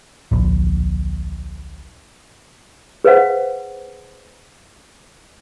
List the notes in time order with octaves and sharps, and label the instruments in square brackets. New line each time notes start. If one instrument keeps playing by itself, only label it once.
[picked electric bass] D1 A#1
[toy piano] G#4 B4 C5 F5 F#5